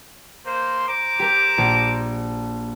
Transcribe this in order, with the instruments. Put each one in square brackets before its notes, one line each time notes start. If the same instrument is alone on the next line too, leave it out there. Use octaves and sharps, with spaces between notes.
[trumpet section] A#3 C5
C5 A#5 D6
[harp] G4 A#4
A#1 D7